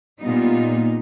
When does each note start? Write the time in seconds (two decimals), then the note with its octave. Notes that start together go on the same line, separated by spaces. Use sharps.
0.21 A#2 G3 B3 D#4 F4